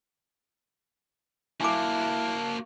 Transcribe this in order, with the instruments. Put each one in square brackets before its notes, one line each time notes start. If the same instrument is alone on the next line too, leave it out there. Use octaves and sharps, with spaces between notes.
[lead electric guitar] A#3 F#4 [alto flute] E4 [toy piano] G#5 D6 [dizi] A5